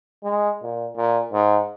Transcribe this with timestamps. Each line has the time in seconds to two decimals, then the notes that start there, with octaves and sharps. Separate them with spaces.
0.24 G#3
0.62 A#2
0.97 A#2
1.33 G#2